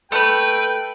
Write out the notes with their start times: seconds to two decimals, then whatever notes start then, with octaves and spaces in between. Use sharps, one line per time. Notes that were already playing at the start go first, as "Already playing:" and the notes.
0.12 A3 B4 G5